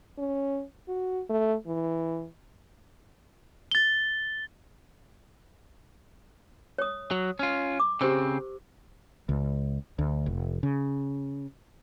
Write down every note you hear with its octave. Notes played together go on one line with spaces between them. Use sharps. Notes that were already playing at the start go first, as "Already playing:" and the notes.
C#4
F#4
A3
E3
A6 G7
C#5 D#6
F#3
C#4 F4
D6
C#3 C4 G4 C5 E6
C#2
D2
F1
C#3